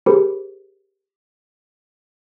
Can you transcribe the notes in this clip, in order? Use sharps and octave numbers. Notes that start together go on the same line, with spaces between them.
G4 G#4 A#4 C5 B5